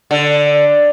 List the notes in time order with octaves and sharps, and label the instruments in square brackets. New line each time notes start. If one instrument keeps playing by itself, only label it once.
[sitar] D3